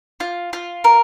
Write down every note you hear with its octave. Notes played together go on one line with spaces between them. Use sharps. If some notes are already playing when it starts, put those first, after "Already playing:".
F4
F4
A#4